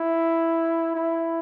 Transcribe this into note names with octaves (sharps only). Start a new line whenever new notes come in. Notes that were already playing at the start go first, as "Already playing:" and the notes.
Already playing: E4
E4